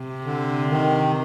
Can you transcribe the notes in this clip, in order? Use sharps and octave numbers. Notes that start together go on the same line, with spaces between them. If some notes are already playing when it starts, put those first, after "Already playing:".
Already playing: C3
D3
D#3